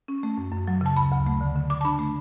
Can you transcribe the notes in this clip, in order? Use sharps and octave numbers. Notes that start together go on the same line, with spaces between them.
C#4
A3
F#2
F#2
F#3
C#3 A5
D2 B5
D2
A3
D3
D3
D3 D6
A5
D4 B5
A3